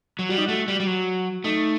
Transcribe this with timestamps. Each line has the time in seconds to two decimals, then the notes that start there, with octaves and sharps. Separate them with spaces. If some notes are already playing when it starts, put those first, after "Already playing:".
0.19 F#3
0.29 G3 F#4
0.38 D#4
0.46 A3 F#4
0.68 G3
0.80 G3
0.87 F#3
1.44 A3 D#4